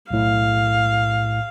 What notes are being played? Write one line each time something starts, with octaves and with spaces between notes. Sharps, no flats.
B1 A2 F5